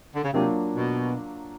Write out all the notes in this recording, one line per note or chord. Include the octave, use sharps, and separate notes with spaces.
D3
C#3
C3 F#3 A#3 D4 F4
B2